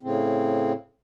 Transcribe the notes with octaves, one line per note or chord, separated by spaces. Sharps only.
A2 C#3 C4